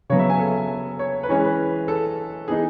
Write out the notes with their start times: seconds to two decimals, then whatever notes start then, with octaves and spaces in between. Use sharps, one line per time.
0.10 C#3 F#3 B3 C#5
0.19 E5
0.30 G#5
0.39 A4
0.99 C#5
1.23 B4
1.29 E3 G#3 C#4 C#5
1.44 B4
1.88 A4
2.48 E3 B3 D#4 G#4